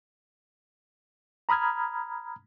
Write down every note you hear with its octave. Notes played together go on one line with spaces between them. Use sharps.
A#5 B5 D#6 F6 G#6